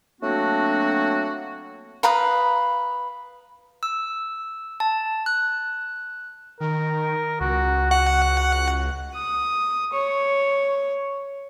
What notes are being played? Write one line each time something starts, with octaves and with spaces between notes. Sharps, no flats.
F#3 A3 A#3 C4 D4 F#4
B4 F5 A#5 D#6
E6
A5
F#6
D#3 A#4
C#2 F#4
F#4 F#5
D#6
C#5